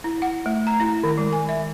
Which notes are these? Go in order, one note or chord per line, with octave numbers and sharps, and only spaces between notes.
E4
F#5
A3
A#5
E4
D#3
G#3
G#5
E5